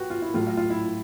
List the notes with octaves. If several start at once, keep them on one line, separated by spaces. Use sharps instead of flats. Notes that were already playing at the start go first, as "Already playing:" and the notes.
Already playing: F#4 G4 B4
F4
E4
A2 F#3 A3 F4
F4
F4
E4